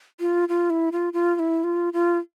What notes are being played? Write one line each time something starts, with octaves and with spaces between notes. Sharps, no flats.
F4
F4
E4
F4
F4
F4
E4
F4
F4